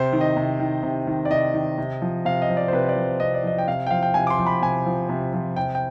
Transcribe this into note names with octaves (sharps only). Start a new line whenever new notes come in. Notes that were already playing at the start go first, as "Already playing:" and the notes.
Already playing: C3 C5
D#3
D#5
C3
D#3
C3
D#3
D5
C3 D#5
D#3
C3
F3
C3 F5
D#5
F3
D5
C5
C3 B4
D5
F3
C3 D#5
D5
F3 D#5
G5
C3 F5
G5
F3 F5
G5
C3 G#5
D6
C6
F3
B5
C3 G#5
F3
C3
F3
C3 G5
G5